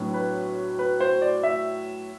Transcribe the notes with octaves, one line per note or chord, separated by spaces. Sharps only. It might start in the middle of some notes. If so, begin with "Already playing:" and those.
Already playing: A2 F#3 B3 D4
B4
B4
C5
D5
E5